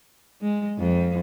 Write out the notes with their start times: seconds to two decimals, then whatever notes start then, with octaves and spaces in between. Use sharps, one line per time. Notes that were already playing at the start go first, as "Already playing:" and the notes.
0.41 G#3
0.78 F2